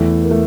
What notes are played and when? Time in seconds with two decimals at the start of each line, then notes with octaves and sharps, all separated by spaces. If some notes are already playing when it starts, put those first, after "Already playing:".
Already playing: E2 E3 A3
0.24 A#3
0.31 A3